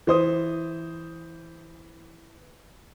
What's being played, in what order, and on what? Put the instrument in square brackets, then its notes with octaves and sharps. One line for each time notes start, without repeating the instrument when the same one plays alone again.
[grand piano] E3 C5 D#6